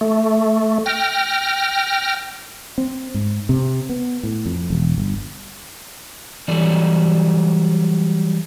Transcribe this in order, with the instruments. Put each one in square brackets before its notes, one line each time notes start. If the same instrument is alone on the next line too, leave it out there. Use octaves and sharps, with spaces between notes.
[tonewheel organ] A3
G5 F6 A#6
[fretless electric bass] C4
G#2
C3
B3
A2
F2
E1
G1
[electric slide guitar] E3 F#3 G3 A4 D5